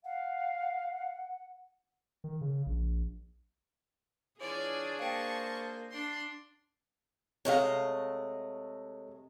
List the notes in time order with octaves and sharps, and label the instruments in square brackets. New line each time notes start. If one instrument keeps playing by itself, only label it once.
[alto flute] F5 [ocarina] F#5
[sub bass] D#3
C#3
A#1
[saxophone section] E3 F4 C#5 [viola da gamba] D4 G#4 [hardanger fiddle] D5 G#5
[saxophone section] A#3 C5 [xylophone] F5 G5 [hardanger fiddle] A5 C#6
[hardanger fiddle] D4 C6
[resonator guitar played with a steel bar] C3 F5 [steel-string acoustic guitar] G#3 A3 D#5 [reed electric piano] G#4 C#5